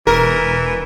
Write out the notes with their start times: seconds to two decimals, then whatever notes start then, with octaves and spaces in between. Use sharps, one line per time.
0.07 E1 E3 A#4